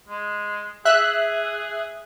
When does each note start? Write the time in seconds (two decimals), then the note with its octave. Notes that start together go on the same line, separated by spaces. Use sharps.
0.08 G#3
0.85 G#4 E5 F#6